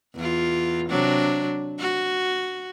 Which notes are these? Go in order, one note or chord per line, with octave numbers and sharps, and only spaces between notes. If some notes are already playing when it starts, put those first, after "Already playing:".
E2 F4
C3 F#3 D4
F#4